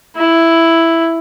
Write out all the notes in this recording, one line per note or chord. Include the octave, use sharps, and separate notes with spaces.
E4